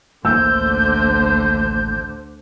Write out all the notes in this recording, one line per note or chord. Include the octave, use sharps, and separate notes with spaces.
A1 D2 D3 D#3 A#3 C5 E6 G6